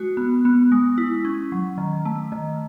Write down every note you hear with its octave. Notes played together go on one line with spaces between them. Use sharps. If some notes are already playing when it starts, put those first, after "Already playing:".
Already playing: G#3 F#4
B3
B3
G#3
E4
C#4
F#3
D#3
A3
D#3